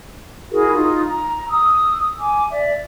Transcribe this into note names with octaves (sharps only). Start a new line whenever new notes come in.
E4 F#4 G#4 A#4
D#4 F4 D#6
A#5
D#6 E6
G#5 D6
D5 E5